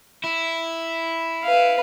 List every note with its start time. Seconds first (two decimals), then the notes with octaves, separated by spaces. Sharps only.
0.24 E4
1.43 B4 F5